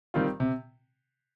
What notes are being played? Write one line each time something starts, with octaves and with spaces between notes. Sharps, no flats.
D#3 G3 C4 F4
C3